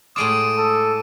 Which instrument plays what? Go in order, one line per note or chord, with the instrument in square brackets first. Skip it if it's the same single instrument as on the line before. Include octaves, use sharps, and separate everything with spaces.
[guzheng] A2 G#3 F4 [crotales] D6 D7 D#7 [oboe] D#6
[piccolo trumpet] A4